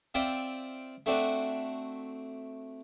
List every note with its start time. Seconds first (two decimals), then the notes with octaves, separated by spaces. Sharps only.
0.14 C4 F4 D5 E5 G5
1.06 A3 C4 D4 F#4